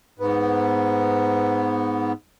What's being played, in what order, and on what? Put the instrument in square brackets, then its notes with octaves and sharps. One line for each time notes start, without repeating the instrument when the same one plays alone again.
[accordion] G#2 B3